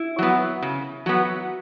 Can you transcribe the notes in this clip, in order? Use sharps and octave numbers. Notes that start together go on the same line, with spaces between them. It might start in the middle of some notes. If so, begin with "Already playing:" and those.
Already playing: E4
F#3 B3
C#3
F#3 B3